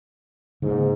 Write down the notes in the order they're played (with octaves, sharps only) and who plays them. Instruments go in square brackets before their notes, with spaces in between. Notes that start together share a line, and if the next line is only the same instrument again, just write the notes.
[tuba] G#2 [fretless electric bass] C#3 A#3